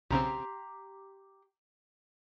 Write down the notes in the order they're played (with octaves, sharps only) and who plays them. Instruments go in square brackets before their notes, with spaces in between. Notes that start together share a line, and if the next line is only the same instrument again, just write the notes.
[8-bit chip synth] B1 C#3 C4 [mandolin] G4 A#5 C6